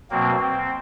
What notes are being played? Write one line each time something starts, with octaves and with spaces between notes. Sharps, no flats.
B2 F#3 A#3 C4
C4